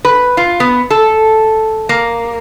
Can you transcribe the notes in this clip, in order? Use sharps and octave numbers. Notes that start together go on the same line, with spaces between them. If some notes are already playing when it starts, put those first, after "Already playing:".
B4
F4
B3
A4
A#3